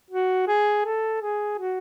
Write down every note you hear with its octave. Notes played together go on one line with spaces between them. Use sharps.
F#4
G#4
A4
G#4
F#4